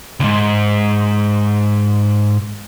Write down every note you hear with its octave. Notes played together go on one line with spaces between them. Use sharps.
C#2 G#2